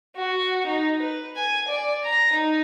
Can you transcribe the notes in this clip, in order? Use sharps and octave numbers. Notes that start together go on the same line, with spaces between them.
F#4
D#4
B4
G#5
D5
A#5
D#4